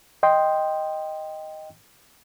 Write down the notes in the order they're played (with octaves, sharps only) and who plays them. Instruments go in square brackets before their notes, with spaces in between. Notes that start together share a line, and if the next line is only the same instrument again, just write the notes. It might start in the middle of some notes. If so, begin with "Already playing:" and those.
[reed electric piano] D#5 G5 C6